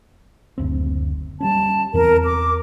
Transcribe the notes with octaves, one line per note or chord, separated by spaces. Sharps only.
F#1 D2 C4
G3 A#3 C#4 A5
E2 E3 C4 A#4
D6